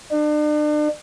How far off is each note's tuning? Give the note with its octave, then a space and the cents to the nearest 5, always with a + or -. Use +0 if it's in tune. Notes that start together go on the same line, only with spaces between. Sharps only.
D4 +40